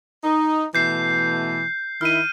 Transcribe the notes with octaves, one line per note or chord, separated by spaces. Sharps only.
D#4
B2 E3 A3 G6 C7
D#3 E4 F6 D#7